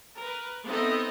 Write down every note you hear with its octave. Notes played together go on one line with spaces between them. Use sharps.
A#4 B4
B3 C4 D#4 A4 D#5 E5